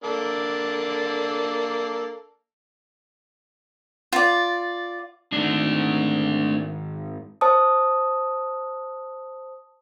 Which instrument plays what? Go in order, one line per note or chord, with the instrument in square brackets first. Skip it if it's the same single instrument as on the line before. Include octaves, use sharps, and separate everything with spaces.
[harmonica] A#3 D4 A4
[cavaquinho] F4 D5
[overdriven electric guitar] G#2 D#3 [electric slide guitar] A3 D4
[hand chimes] C5 A5 D#6